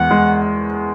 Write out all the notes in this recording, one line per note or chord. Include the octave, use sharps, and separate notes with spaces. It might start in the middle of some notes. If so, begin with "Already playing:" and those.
Already playing: E2 G#3 F#5
G#3